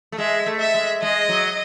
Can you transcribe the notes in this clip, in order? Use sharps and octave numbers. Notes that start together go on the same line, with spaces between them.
A3
G#3 E5
A3
E5
G#3
G#3 D#5
F#3